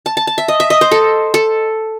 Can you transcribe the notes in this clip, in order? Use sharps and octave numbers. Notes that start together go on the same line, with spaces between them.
A5
A5
A5
E5
D#5
E5
D#5
C5
A4
A4